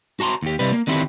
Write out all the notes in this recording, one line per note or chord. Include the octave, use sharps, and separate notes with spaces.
F#4 A5 A#5 C6
D#2 G4
C3 G3 B4
A#3
D3 D#3 C4 E4 G4 A4